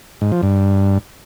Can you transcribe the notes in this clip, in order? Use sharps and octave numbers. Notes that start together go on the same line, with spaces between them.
G#2
F3
G2